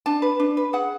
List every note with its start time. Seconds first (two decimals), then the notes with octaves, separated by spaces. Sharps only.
0.06 D4 A5
0.22 B4
0.40 D4
0.57 B4
0.73 G#4 F#5